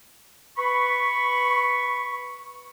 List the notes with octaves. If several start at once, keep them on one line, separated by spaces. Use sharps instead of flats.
B4 B5 C#6